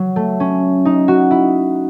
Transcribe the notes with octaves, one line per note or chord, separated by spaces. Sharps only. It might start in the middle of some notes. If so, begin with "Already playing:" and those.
Already playing: F#3
A3
C#4
D#4
F#4
E4